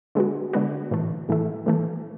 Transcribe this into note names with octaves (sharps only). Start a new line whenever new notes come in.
D3 G#3 B3 F#4
D3 G#3 B3 F#4
A2 E3 A3
A2 E3 A3
A2 E3 A3